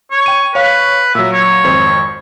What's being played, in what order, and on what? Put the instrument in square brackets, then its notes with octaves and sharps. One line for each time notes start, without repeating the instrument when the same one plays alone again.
[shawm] C#5
[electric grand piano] G5 D#7
[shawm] B4 [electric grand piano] C#5 F5 C#6
[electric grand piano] A#2 F#3 [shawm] E5
[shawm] C#5
[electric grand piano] G#1 F2 C5